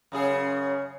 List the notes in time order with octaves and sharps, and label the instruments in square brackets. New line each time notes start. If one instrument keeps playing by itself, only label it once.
[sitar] F#2 C#3 G#4